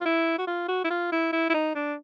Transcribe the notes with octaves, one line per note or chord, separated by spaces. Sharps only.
F4
E4
F#4
F4
F#4
E4
F4
E4
E4
E4
D#4
D4